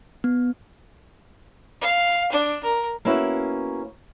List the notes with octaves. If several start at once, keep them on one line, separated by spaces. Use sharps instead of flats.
B3
F5
D4
A#4
A#3 B3 C#4 E4 F#4